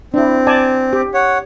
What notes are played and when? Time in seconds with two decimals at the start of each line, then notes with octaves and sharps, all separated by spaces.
0.14 C4 D4 E4
0.47 D5 G#5 A5
0.93 G4
1.14 C#5 F#5